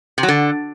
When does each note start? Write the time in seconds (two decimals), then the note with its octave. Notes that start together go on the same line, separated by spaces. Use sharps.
0.18 C3
0.23 F#3
0.28 D3